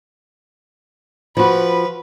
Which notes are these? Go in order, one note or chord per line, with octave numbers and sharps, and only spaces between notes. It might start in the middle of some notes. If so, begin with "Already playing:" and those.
F3 F#4 B4